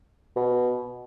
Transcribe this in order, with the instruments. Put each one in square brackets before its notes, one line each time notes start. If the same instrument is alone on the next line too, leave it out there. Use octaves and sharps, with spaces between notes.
[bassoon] B2